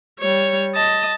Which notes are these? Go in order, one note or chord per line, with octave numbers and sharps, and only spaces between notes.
G3 C#5
D#5 A5